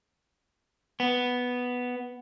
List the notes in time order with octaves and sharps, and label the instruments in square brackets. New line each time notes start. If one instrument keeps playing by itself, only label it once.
[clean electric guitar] B3